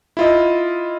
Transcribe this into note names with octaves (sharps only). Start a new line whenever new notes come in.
E4 F4 D#5